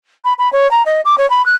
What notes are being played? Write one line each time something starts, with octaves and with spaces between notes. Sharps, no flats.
B5
B5
C#5
A#5
D#5
D6
C#5
B5
F#6